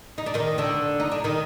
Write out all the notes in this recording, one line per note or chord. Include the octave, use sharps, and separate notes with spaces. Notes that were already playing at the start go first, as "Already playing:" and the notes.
D#4
D4
D#3 D#4
D3 D4
D#4
D4
D#3 D#4